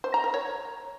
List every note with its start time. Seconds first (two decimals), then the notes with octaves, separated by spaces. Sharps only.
0.04 C5
0.14 A#5
0.24 A#4
0.34 C#5